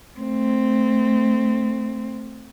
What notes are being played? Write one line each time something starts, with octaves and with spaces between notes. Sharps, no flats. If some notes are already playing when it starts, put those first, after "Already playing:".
A3 C4